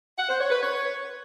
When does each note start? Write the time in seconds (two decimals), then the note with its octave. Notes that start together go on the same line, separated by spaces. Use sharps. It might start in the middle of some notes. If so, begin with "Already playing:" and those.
0.18 F#5
0.29 C5
0.40 C#5
0.50 B4
0.61 C#5